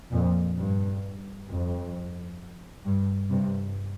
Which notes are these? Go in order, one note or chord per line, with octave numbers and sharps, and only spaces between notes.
F2 A#2
G2
F2
G2
G2 C3